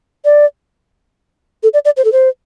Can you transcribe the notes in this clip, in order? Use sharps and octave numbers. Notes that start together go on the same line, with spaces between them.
D5
A4
D5
D5
C5
A4
C5